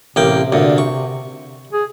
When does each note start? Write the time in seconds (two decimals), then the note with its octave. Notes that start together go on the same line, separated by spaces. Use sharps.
0.16 A1 C3 A#3 G5
0.52 D2 A#2
0.78 C#6
1.73 G#4